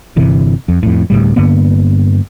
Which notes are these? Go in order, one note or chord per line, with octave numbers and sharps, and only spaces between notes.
G1 C3 E3
F2
F2 A2
D2 A2 G3
G2 D3 A#3 B3